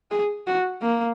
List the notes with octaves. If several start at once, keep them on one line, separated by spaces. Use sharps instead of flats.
G#4
F#4
A#3